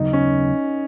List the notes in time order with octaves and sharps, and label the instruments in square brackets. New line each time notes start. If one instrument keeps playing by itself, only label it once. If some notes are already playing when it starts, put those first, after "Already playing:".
Already playing: [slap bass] D#2 C#3 F#3 B3 [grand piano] D#4
[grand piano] C#4